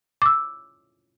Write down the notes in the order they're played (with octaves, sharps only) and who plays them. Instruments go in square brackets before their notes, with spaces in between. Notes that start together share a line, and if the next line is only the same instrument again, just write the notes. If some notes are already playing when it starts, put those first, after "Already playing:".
[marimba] D6 E6